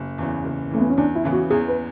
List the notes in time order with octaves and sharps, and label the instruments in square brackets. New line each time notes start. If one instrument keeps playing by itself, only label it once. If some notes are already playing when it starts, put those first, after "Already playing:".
Already playing: [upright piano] F#1
E2 C#3 E3
F#1
[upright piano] E2 C#3 E3 [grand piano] A3
[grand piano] B3
C#4
[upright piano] E2 [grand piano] D4
[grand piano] E4
[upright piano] C#3 E3 B3
[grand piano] F#4
[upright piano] E2 [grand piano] G#4
[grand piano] B4